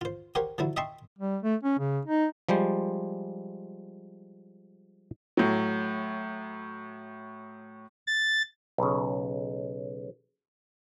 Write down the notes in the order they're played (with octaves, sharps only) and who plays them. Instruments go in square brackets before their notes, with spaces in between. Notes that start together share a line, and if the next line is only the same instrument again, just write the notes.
[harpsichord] F4 C5
G4 A#4 C5 C#5 F#5
D3 F3 F#3 E4
D#5 E5 G5 A5 C6 C#6
[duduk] G3
A3
C#4
C#3
D#4
[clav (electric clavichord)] F3 G3 G#3 C5
[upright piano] A2 F#3
[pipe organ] A6
[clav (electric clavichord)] B1 C#3